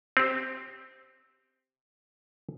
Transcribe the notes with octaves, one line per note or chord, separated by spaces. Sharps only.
C4 G4